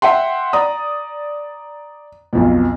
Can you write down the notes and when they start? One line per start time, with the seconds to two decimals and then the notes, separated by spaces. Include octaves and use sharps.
0.02 E5 F#5 G5 C6
0.53 D5 A#5 D#6
2.33 B1 F2 B2